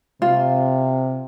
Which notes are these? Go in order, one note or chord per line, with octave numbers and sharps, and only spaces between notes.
C3 F4